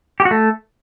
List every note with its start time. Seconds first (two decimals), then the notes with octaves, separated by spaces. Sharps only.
0.20 G4
0.25 F#4
0.31 A3